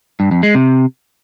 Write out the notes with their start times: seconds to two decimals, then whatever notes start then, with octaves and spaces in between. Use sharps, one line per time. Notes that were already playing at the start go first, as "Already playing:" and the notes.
0.20 G2
0.31 F2
0.43 G#3
0.55 C3